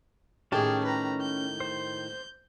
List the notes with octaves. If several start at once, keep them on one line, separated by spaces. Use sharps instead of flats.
A2 D#3 C#4 G4 G#4 A5
B4 A#5
G6
C5